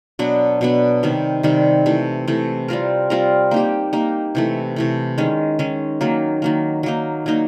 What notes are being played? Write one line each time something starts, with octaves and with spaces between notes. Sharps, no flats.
B2 F#3 B3 D4
B2 F#3 B3 D4
C3 D#3 G3
C3 D#3 G3
C3 E3 A3
C3 E3 A3
G3 C4 F4 A#4
G3 C4 F4 A#4
A#3 D#4 G4
A#3 D#4 G4
C3 E3 A3
C3 E3 A3
D#3 G#3 C#4
D#3 G#3 C#4
D#3 F#3 A#3
D#3 F#3 A#3
F#3 A#3 D#4
F#3 A#3 D#4